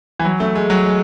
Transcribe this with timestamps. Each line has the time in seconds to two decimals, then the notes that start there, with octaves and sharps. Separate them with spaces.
0.20 E3
0.25 F#3
0.40 A3
0.55 G#3
0.70 F#3
0.85 G#3